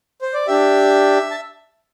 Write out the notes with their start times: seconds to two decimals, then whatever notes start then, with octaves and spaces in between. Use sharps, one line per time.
0.21 C5
0.34 D5
0.47 D4 G4 E5
1.31 A5